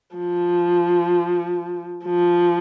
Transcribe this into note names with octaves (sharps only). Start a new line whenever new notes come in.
F3
F3